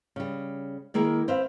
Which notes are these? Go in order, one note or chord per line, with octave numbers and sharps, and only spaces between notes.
C#3 G3
D#3 A#3 E4 G#4 A#4
C4 B4 E5 F5